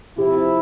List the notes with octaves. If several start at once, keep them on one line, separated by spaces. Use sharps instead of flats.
C3 F3 C4 E4 G4